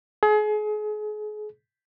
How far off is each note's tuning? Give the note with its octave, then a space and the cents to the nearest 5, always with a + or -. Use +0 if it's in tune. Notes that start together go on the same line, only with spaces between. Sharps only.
G#4 +35